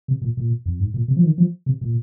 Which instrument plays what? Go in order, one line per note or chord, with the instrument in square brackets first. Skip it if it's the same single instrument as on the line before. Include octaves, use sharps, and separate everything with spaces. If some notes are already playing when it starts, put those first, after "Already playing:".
[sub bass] C3
A#2
A#2
F2
G#2
A#2
C3
F3
D#3
F3
C3
A#2